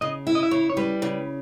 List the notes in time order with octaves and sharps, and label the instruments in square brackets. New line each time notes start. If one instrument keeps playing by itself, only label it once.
[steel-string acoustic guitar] C#3 [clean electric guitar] D#5
[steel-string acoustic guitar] E4 [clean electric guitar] E5
[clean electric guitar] D#5
E5
[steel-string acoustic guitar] C#3 [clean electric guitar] C#5
[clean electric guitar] C#5
[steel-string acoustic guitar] G3 [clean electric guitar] B4
[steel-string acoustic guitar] C#3